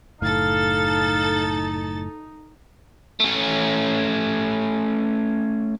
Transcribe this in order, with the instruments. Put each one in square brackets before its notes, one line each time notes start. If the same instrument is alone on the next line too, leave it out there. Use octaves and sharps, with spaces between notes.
[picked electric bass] F#1 A2 [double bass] D#4 [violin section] A4 A6 [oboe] F5
[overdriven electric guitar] A3 C#4